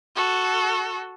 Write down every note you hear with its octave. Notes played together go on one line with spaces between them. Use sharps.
F#4 A4